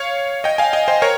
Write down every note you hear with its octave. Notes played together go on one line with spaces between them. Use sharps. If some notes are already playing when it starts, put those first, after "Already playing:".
Already playing: C#5 F5
D#5 G5
F5 G#5
D#5 G5
C5 D#5
A#4 C#5